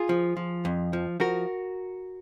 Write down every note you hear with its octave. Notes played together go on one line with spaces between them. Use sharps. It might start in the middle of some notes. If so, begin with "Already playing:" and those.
Already playing: F4 G#4
F3
F3
F2
F3
F3 F#4 A#4